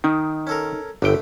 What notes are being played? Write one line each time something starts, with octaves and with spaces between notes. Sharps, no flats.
D#3 D#4
C#4 A4 A#4
G1 D3 A3 G5